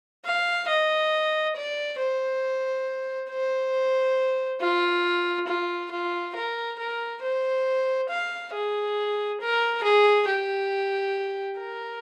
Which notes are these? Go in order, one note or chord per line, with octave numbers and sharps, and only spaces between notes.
F5
D#5
D5
C5
C5
F4
F4
F4
A#4
A#4
C5
F5
G#4
A#4
G#4
G4
A#4